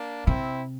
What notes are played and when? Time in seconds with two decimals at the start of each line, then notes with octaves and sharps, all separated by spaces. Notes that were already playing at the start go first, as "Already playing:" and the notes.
Already playing: A#3 D4
0.27 C3 C4 E4